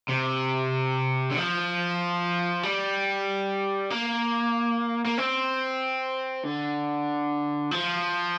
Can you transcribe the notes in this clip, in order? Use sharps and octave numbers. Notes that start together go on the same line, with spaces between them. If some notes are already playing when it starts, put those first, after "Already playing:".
C3
D3
F3
G3
A#3
A#3
C4
D3
F3